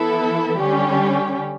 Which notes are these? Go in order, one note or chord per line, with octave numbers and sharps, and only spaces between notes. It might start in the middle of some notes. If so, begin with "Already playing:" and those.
Already playing: E3 B3 E4 A4
D3 G3 C#4 G4